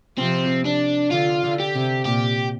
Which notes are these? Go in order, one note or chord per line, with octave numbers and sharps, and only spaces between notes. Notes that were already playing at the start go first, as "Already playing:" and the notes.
C3 F3 C4
D4
D3 F4
D3
G4
C3
A#2 G4